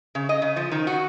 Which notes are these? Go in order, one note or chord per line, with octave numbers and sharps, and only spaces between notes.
C#3
D#5
C#3
F3
D#3
F#4